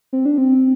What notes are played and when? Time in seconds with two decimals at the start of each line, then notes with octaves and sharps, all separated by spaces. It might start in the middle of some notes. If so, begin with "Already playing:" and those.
0.13 C4
0.26 D4
0.38 C4